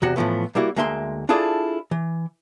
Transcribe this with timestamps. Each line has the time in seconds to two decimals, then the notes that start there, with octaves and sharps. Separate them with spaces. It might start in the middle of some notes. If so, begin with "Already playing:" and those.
0.02 E2 C3 F#4 F#5
0.16 A2 E3 F3 A3 B3
0.55 G3 A#3 E4 F#4
0.76 D2 G#3 A#3 E5 G5 C6
1.29 D4 E4 F4 G#4 A4 D5
1.91 E3